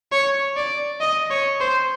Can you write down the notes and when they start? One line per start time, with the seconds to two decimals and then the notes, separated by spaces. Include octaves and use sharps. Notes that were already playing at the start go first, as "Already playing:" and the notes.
0.12 C#5
0.57 D5
1.01 D#5
1.30 C#5
1.60 C5